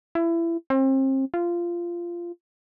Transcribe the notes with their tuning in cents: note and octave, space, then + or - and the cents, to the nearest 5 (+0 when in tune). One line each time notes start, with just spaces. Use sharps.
E4 +25
C4 +35
F4 -15